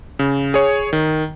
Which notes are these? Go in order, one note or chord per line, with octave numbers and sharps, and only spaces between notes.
C#3
G#4 C#5
D#3